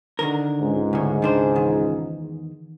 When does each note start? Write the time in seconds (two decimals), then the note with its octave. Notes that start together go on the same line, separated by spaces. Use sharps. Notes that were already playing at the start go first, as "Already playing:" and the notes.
0.19 D3 D#3 A#4
0.61 C#2 G#2
0.93 D2 A2
1.22 D#3 D4 C5
1.55 E2 D#3